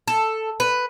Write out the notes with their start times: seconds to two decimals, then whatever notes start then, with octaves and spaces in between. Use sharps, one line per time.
0.08 A4
0.60 B4